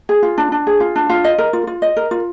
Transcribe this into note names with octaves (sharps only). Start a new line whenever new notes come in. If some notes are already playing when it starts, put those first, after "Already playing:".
G#4
F4
D4
D4
G#4
F4
D4
F4
D#5
A#4
F4
F4
D#5
A#4
F4